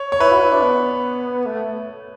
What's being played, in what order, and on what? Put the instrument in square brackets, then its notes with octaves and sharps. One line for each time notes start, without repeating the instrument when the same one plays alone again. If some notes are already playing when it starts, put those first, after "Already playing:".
Already playing: [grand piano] C#5
C#5
[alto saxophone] E4 [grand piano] B4
[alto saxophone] F#4
E4
D4
B3
A3